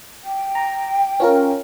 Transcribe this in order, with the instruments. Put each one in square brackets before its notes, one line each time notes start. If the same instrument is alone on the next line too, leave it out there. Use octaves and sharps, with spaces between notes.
[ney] G5
[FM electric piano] A#5
C#4 F4 A#4